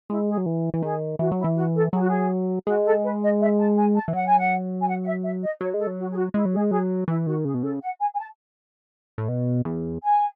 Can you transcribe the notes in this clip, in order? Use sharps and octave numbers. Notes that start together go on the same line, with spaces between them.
G#3 E4
G#4
F#3
E3
E3
D#3 G#4
E3 F#4
F#3
E4
E3
F#4
A4
F#3 G#4
F#4
G#4
G#3 F#4
A4
B4
D#5
E5
A5
G#5
A5
E3
F#3 F#5
G#5
F#5
G#5
F#5
F#5
E5
E5
D#5
F#3 C#5
G#3
A4
F#3
F#4
G#4
F#4
G#3 E4
F#3
G#4
G#3
F#3 G#4
E3 E4
D#3 F#4
C#3 G#4
B2
C#3 A4
F#5
G#5
G#5
A5
A2
B2
E2
G#5